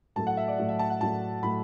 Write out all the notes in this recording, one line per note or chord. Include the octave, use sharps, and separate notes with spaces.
A2 F#3 A3 A5
F#5
E5
D5
A2 F#3 A3 E5
E5
A5
F#5
A2 F#3 A3 A5
A2 F#3 A3 B5